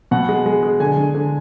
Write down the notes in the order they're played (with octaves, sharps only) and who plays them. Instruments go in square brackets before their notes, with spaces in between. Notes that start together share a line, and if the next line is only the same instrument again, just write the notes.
[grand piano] B2 F#5
G#3
G#3
G#3
D3 G#5
D3
D3